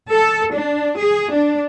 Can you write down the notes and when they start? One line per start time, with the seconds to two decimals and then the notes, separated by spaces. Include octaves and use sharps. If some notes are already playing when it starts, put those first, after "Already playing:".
0.11 A4
0.56 D4
0.97 G#4
1.34 D4